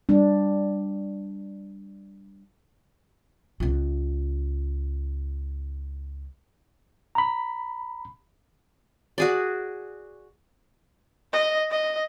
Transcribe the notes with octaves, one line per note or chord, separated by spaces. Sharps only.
G3 D4
C#2 F4
A#5 B5
F#4 G#4 D5
D#5
D#5